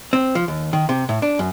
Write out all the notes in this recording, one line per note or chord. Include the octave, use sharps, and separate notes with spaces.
C4
F3
D#2
D#3
C3
A2
D4
F#2